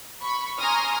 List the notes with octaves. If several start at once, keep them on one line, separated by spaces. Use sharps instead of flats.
B5 C#6
G#5 A#5 C6 C#6 D#6 F6